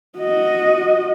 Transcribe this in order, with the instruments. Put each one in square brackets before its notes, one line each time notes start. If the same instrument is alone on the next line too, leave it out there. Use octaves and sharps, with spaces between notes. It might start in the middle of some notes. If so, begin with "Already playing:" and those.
[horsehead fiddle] F#4 D#5